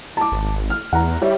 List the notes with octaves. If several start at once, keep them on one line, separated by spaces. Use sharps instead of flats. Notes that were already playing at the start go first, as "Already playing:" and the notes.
A5 D6
G#1
F6
E2 F#5 A#5
G3 G4 C#5 E5